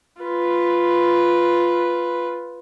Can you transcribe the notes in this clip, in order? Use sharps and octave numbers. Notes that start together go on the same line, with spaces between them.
F4 B4